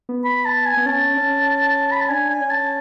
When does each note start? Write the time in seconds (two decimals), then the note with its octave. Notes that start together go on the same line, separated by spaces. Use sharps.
0.09 B3
0.24 B5
0.45 A5
0.66 G#5
0.77 B3
0.86 C#4 A5
1.18 C#4
1.91 B5
2.01 A5
2.09 D4 G#5
2.30 G#5
2.41 C#4
2.51 A5